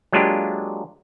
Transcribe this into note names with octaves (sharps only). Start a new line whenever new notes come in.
F#3 G#3 A#3 D4 F4 G4